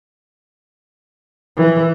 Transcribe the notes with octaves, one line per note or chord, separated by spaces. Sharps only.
E3